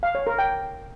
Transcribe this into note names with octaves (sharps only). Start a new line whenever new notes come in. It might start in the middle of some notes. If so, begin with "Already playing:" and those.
F5
C#5
A#4
G5